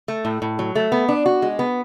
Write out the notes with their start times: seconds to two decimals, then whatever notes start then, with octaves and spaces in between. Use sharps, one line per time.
0.08 A3
0.25 A2
0.42 A2
0.59 F#3
0.75 A3
0.92 B3
1.08 D4
1.26 F#4
1.42 G#3
1.59 B3